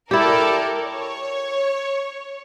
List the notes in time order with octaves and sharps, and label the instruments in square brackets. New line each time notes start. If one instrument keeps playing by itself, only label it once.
[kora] E4 G4 [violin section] A4 A#4 D5
[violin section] C#5